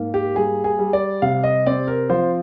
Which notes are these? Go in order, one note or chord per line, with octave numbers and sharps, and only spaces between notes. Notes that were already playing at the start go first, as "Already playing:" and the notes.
Already playing: G#2 A#3
G4
G3 G#4
G#4
G3
D5
C3 F5
D#5
C4 D5
A#4
F3 C5